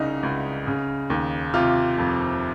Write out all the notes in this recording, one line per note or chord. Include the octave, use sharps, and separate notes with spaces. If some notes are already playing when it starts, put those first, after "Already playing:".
Already playing: C2 C#3 D#4
C#2
C#3
D#2
C3 F4
F2